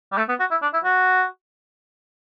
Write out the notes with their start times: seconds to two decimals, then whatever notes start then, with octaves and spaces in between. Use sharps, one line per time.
0.12 G3
0.17 A3
0.29 B3
0.40 F#4
0.51 E4
0.62 D4
0.73 E4
0.84 F#4